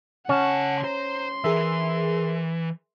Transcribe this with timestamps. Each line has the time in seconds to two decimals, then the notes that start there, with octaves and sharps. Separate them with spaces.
0.29 C#3 C#4 F#5 A5
0.84 C5 A#5 C6
1.44 E3 G#4 A#4 E5